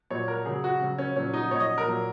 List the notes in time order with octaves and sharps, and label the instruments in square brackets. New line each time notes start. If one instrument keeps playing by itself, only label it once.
[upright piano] A#2 F#3 C#5
A#4
C#3 F#3 G#4
F#4
C#3 F#3
C#4
A#2 F#3 C#4
D#4
A#2 F#3 C#5
D#5
A#4
A#2 F#3